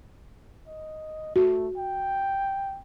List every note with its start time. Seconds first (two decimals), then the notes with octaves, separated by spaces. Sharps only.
0.67 D#5
1.36 A3 F#4
1.77 G5